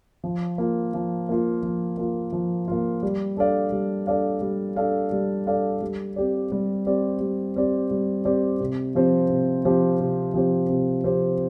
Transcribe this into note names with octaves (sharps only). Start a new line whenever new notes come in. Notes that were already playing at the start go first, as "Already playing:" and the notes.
F3
A#3 F4
F3
A#3 F4
F3
A#3 F4
F3
A#3 F4
G3
D4 A4 D5 F5
G3
D4 A4 D5 F5
G3
D4 A4 D5 F5
G3
D4 A4 D5 F5
G3
C4 G4 D5
G3
C4 G4 D5
G3
C4 G4 D5
G3
C4 G4 D5
C3
F3 C4 G4 C5
C3
F3 C4 G4 C5
C3
F3 C4 G4 C5
C3
F3 C4 G4 C5